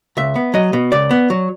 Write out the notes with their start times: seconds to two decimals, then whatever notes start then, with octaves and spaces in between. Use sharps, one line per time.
0.17 C#2 E5
0.36 B3
0.54 F#3 D#5
0.73 B2
0.92 C#2 D5
1.11 B3
1.30 F#3